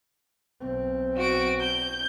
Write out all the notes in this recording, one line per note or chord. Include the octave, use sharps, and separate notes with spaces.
B1 C4
F#4 D7
G6